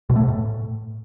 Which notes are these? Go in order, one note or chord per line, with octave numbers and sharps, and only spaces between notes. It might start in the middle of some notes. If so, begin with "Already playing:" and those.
B2
A3
G#2
A2